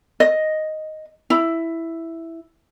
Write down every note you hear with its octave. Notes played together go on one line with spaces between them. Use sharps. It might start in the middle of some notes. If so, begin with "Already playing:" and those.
D#5
E4